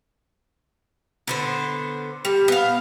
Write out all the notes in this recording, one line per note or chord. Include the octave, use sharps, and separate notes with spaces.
D3 B3 C5
G3
B3 F5